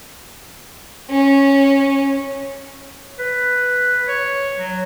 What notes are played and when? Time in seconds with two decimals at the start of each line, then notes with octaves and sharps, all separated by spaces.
1.10 C#4
3.19 B4
4.08 C#5
4.59 F#3